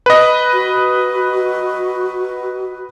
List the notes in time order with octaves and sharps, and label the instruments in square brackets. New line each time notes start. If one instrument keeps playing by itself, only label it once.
[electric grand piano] B4 D#5
[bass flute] F#4